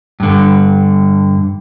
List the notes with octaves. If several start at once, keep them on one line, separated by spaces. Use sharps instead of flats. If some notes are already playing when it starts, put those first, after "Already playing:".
G2 D3